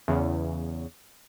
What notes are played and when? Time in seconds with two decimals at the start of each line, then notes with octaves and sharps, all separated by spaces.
0.08 E2 C#3